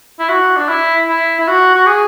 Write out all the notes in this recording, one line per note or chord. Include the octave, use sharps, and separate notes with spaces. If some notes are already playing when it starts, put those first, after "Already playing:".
E4
F#4
D4
E4
E4
E4
F#4
F#4
G#4